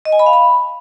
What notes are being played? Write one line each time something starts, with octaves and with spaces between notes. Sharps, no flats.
D#5
G#5
B5
F5
B5